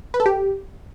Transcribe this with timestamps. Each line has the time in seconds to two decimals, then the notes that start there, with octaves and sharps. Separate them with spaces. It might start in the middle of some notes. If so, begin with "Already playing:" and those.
0.14 B4
0.20 A4
0.26 G4